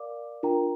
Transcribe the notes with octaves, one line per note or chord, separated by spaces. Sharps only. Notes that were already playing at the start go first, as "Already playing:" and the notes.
Already playing: A#4 D5 F5 D6
D4 F4 A#4 G5 A#5